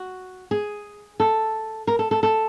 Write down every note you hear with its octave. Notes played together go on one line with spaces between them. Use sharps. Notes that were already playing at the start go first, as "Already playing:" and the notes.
Already playing: F#4
G#4
A4
A#4
A4
A4
A4